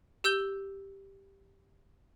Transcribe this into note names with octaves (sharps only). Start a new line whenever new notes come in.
G4 E6 G6 G7